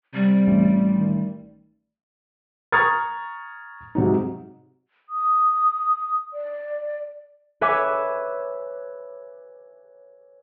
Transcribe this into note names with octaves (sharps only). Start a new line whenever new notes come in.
C3 G3
A1
D#3
A#5 C#6 D#6 F6 G#6 A6
G#2 C3 F#3 D#4
D#6
D5
B4 C#5 E5 G#5 D6